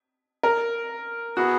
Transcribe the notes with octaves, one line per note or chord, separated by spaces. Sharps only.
A#4
B3 E4 F#4 G#4 B4